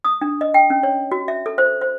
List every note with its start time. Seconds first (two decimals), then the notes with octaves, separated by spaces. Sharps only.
0.04 D#6
0.21 D4
0.41 D#5
0.54 G5
0.70 C#4
0.83 C#5
1.12 F#4
1.28 E5
1.46 A4
1.58 C5
1.81 C5